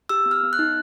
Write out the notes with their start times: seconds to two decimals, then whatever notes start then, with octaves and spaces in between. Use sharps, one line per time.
0.09 G4 E6
0.26 B3
0.31 F6
0.43 B3
0.53 F#6
0.59 D#4